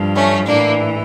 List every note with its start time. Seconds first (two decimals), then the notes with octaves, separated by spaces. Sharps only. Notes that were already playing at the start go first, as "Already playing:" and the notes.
Already playing: G2 F3
0.15 A3 C#4
0.48 A2 E3 A#3 D4